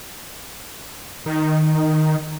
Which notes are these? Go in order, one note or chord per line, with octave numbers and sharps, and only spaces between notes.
D#3